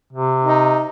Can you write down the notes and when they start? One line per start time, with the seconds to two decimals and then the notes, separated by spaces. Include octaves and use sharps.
0.13 C3
0.44 D#4